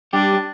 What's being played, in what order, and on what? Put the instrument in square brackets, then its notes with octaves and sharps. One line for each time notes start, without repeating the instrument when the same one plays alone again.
[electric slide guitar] G3 G4 [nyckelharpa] D4